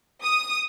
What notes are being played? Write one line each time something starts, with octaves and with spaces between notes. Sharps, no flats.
D#6